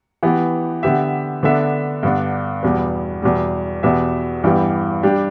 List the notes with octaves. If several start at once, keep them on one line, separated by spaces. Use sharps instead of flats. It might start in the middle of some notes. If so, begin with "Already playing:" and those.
E3 B3 G4
D3 B3 G4 E5
D3 B3 D4 A4 E5
G2 D3 B3 D4
E2 B2 G3 B3
E2 B2 G3
E2 B2 B3 G4 E5
G2 E3 G3 B3 G4
G3 D4 G4